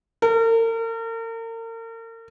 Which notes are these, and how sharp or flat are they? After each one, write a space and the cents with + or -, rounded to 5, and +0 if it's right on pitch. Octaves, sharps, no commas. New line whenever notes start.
A#4 -40